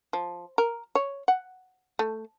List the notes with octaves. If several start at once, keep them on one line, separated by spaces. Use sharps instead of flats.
F3
A#4
C#5
F#5
A3